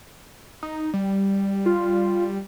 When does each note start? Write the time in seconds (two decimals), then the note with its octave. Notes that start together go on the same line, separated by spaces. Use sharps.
0.63 D#4
0.94 G3
1.66 F4